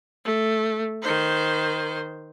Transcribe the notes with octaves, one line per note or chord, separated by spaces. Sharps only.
A3
D#3 C5